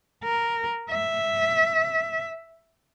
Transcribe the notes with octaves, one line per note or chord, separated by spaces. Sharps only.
A#4
E5